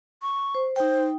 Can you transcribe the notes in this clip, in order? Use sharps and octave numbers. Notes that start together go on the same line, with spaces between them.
C#6
C5
D#4 C5 G5